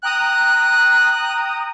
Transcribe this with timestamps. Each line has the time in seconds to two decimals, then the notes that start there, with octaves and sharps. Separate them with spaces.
0.03 G5 A#5 D#6 F#6